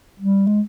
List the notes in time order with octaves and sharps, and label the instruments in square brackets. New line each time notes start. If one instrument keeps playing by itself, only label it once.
[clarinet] G3
G#3